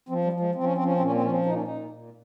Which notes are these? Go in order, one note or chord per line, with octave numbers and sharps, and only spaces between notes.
F3 C4
G3
F3
G#3
F3 C4
C#4
F3 C4
C#4
C4
A#2 C#4
C4
F3 C#4
C4
A#2 D#4
C#4
D#4
A#2
A#2